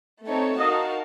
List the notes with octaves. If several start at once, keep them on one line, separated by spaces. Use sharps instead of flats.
A3 C4 D#4 A4 C#5
D#4 F#4 A#4 D#5 F5 A5